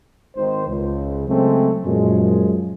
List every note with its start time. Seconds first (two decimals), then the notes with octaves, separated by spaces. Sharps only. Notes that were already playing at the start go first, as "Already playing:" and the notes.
0.36 G#1 D#3 C5
0.67 C#2
1.28 C#3 F#3 G#3 A3 C4
1.86 F#2 A#2 F3 G#3